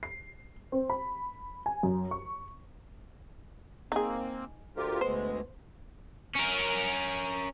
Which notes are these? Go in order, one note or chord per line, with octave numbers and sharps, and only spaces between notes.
C7
C4
B5
G#5
F#2
C#6
A#3 C4 D#4 G#4
D2 F4 G4 A#4
D2 G#3 B3 C5
C#4 A#4